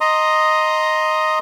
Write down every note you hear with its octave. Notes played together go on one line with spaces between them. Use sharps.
D#5 A#5 C6 D#6